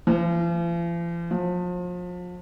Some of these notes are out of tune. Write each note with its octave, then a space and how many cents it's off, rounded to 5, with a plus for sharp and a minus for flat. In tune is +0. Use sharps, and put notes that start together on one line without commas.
F3 -45
F3 +35